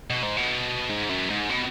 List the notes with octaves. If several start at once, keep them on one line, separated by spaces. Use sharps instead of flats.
B2
G#2
B2
G#2
F#2
G#2
B2